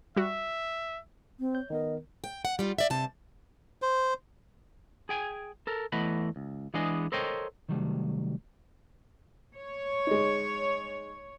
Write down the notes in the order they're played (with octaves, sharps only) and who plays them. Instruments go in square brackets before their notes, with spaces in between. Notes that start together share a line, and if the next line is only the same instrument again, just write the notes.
[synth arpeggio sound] G3 F#4 [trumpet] E5
[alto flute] C4
[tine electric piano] C#5 G6
[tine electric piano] D#3 B3 A#4 [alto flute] D#5
[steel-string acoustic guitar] G5
F#5
G3 F4
D5 E5
G2 C3 A5
[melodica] C5
[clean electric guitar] G#4 G5 G#5
A4 A#4
E2 E3 A3 D#5 F#5 B5
C#2
E3 G#3 B3 D4 G#4 D#5
A4 A#4 C5 C#5 D#5 G5
C3 D#3 F#3 G3 A3
[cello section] C#5
[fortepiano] G#3 D#4